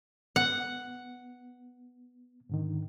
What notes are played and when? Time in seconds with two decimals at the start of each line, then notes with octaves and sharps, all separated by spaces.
0.36 B3 F#5
2.49 G#2 D3 D#3